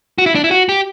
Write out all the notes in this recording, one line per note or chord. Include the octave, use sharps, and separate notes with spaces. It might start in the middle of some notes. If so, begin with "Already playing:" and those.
F#4
E4
D4
E4
F#4
G4